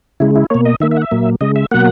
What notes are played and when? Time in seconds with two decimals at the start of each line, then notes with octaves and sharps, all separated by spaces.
0.20 C#3 G#3 E4
0.36 E4
0.50 B2 A#3 C#5
0.65 D#5
0.80 D#3 A#3 E5
0.91 E5
0.97 F#5
1.01 E5
1.11 A#2 F#3 A#3
1.41 C#3 G#3 D#5
1.56 E5
1.71 B2 F#3 A#3 F#5